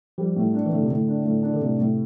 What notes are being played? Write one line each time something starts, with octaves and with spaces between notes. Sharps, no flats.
F3 G3
A2
D4
E3
A2 D3
C3
A2 D3
D4
A2
D4
D3
A2 C3
A2